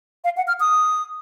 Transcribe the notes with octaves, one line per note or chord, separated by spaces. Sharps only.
F5
F#5
F6
D#6